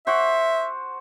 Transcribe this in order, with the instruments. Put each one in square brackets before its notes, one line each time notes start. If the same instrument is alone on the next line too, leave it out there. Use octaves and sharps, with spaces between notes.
[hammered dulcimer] F#4 C5 [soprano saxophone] E5